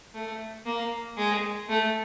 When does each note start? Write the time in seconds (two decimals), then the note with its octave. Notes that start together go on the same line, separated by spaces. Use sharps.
0.14 A3
0.66 A#3
1.18 G#3
1.69 A3